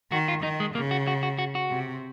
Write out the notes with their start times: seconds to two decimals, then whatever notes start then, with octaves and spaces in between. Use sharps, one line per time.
0.12 D#3 F#4
0.28 F4
0.43 D#3 D#4
0.60 G#3
0.75 C#3 A#3
0.91 F#4
1.07 F#4
1.23 F#4
1.38 F#4
1.55 F#4
1.70 C3